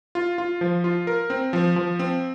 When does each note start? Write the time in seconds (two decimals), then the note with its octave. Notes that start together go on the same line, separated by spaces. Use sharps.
0.15 F4
0.38 F4
0.61 F3
0.84 F4
1.07 A#4
1.30 C4
1.53 F3
1.76 F3
1.99 C4